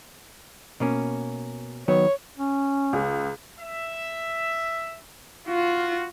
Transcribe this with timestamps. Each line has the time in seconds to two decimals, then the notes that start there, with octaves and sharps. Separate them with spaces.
0.80 B2 A#3 C#4
1.88 D#3 F#3 B3 C#5
2.37 C#4
2.93 C#2
3.60 E5
5.48 F4 F#4